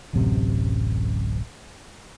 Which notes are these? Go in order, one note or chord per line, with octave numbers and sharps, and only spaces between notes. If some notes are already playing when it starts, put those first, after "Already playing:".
D1 A1 F#2 C3